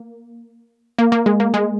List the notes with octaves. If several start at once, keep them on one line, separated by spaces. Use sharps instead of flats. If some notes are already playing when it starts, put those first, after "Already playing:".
Already playing: A#3
A#3
A#3
G#3
A#3
G#3